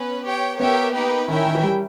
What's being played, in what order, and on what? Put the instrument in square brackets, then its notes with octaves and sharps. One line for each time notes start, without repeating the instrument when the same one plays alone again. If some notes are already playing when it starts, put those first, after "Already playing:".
Already playing: [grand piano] B3 [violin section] C#4 B4
[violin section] G4 C#5 G5
[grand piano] B3 [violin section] G4 A#4 C#5 E5 G5
[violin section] A#3 D#4 G4 B4 G5
[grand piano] D#3 [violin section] C#4 E4 A#4 E5 G5
[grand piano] D#3
E3
G3